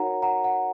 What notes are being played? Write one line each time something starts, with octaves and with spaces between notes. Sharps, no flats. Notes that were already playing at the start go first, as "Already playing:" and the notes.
Already playing: D#4 F#4 A#4 C#5 F#5 A#5
F#5 A#5
F#5